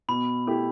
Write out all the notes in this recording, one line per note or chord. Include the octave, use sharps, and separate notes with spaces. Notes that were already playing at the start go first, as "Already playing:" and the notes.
B2 B5
A3 E4 G4